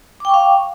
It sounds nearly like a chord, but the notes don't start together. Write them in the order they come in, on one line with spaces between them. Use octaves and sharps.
D6 G5 C#6 F5